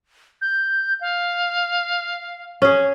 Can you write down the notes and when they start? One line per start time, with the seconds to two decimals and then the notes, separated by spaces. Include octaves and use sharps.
0.41 G6
1.01 F5
2.62 C#4 G#4